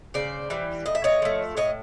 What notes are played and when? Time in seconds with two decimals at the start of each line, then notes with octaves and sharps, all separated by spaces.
0.14 C#3 C5 D5
0.50 E3 G3
0.86 A2 D#5
0.95 E5
1.04 C#5 D#5
1.22 F3 A3
1.57 A2 C#5 D#5